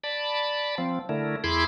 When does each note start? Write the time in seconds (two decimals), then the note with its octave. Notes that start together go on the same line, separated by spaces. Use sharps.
0.04 D5 A5 B5
0.78 F3 C4
1.09 D3 A3 E4 A#4
1.44 E2 E4 G#4 B5 C6 D6